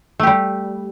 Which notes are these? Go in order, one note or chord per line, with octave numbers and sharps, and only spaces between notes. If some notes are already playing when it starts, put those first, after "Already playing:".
G3 A3 G4